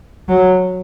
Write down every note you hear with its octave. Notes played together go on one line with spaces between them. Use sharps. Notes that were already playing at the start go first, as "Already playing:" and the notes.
F#3